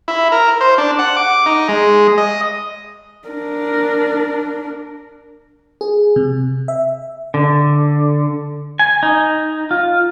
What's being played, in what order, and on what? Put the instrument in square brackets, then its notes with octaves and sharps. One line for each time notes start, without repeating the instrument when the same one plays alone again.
[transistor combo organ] E4
A#4
C5
D4
F#5
D6
D#4
G#3
D#5
[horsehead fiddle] D4 A#4
[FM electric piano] G#4
C3
E5
[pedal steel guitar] D3
G#5
D#4
F4